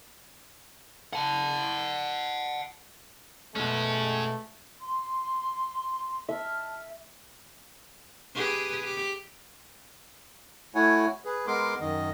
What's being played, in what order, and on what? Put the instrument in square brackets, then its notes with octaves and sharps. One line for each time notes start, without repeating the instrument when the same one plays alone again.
[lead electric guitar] F#5 A5
[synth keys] B2 G#3 [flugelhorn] A3 [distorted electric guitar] C#4 F#4
[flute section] C6
[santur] E5 [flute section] A5 F6
[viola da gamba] G4 G#4 B4
G4
[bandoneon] A3 E4 F#4 C#5 F#5 G#5
G#4 B4
G#3 B3 A#4 C6 D6
F#2 D#3 D#5